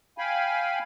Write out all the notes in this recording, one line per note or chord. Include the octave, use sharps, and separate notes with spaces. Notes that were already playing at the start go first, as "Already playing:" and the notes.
F5 G5 G#5 B5